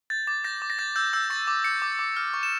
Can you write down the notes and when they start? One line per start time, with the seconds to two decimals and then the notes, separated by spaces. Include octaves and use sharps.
0.10 G6 A6
0.27 D6 A6
0.44 G6 A#6
0.62 D6
0.70 A#6
0.79 G6 A6
0.96 E6 G6
1.13 E6 G6
1.30 C#6 A6
1.47 D6
1.64 D6 C#7
1.82 D6
1.99 D6
2.16 F6
2.34 C#6
2.43 E7